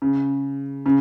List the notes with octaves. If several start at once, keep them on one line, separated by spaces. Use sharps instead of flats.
C#3
C#3